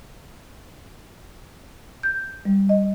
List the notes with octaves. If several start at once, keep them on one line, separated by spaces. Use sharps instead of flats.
G6
G3
D#5